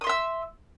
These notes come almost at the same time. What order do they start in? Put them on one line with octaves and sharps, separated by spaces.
D#6 C6 E5 E6